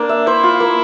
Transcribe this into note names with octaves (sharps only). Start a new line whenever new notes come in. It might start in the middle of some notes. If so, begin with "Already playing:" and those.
Already playing: A#3 D4
E5
E4 C5
F4
A#3